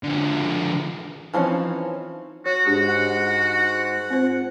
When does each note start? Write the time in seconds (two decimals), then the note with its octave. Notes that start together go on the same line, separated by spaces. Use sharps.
0.03 D3 F3
1.34 E3 F3 C4 C#4 D#4
2.46 F#4 C#5
2.66 G#2 G#3 D4 F#4 G4
2.88 F#5
4.10 C4 F4 C5